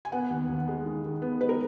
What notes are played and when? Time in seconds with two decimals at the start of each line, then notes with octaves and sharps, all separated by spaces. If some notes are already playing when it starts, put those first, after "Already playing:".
0.05 G#5
0.12 B3 F#5
0.30 D#2
0.49 D#2
0.68 G#3
0.86 D#3
1.04 D#3
1.22 B3
1.40 G#3 B4
1.49 A#4